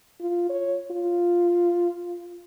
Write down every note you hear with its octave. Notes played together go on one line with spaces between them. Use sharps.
F4
C#5
F4